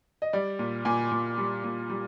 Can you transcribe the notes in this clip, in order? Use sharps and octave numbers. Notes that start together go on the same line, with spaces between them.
D#5
G3 D5
A#2
A#2 G#5
A#2
G3
A#2
G3